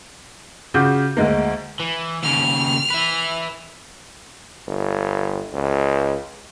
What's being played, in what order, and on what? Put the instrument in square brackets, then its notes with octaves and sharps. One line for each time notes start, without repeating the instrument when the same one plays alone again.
[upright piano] C#3 F4 F#4 D6 G6
D2 G#3 A#3
[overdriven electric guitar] E3
[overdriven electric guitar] D#2 C#3 [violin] F6
[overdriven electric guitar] B4 E5
[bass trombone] G1
C#2